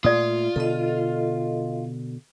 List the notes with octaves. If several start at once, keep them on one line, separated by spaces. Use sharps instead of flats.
A#2 A3 F4 D5 D#6
B2 D3 A4 D#5